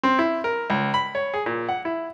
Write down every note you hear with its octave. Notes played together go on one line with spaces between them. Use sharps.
C4
E4
A#4
C#2
B5
C#5
G#4
A#2
F#5
E4